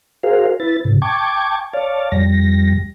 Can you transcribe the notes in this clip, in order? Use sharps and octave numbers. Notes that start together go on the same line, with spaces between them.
F#4 G#4 A#4 C5 F5
E4 B4 A6
G#2 C#3
G5 A5 C#6 D6 G#6
C#5 D5 F5 A5
F2 G3 A#6